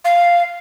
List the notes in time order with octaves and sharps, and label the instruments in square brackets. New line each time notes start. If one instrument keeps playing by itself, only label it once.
[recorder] F5